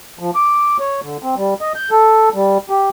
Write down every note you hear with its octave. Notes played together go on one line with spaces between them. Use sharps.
F3
D6
C#5
D3
C4
G3
D#5
G6
A4
G3
G4